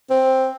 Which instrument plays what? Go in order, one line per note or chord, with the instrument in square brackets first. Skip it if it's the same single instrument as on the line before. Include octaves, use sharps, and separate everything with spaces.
[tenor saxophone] C4